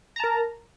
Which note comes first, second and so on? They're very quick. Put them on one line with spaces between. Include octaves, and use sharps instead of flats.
A#5 A5 A#4